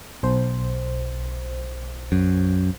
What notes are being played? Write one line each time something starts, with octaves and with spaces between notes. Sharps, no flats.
B1 C5
F#2